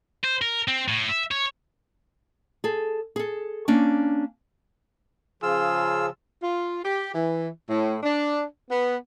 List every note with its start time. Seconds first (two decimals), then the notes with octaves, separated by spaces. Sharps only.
0.24 C5
0.41 A#4
0.68 C4
0.88 A2
1.09 E5
1.31 C#5
2.64 G#4 A4
3.16 G#4 A4
3.68 A#3 C#4 D4
5.43 C#3 F3 F4 G#4 E6
6.41 F4
6.83 G4
7.14 E3
7.69 A2
8.03 D4
8.69 B3